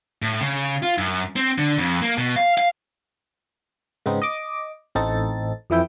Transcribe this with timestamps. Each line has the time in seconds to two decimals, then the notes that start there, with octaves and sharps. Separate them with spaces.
0.22 A2
0.41 C#3
0.83 F4
0.98 F#2
1.36 C4
1.58 D3
1.79 F2
2.02 A#3
2.18 B2
2.36 F5
2.58 F5
4.06 G#2 C#3 B3 C4 D#4
4.22 D#5 D6
4.95 A1 A2 C4 D#4 A4 A6
5.70 F2 E3 E4 G5